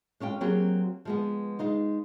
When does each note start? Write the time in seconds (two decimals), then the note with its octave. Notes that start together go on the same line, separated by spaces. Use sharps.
0.20 G#3 C#4 F4 G5
0.41 F#3 A#3 C4 G4 G#4
1.05 F3 G#3 B3
1.59 G#3 D#4 F4